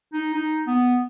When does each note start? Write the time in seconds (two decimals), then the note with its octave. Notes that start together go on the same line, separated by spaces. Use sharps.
0.13 D#4
0.34 D#4
0.67 B3